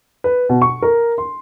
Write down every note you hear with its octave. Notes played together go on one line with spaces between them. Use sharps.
B4
B2
C#6
A#4
C6